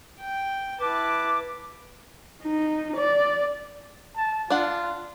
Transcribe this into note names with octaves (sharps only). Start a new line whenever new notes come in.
G5
E4 B4 A5 D6
D#4
D5
A5
D4 F4 F#5